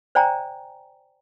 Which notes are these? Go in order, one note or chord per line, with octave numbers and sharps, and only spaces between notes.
C5 D5 G5 G#5 A#5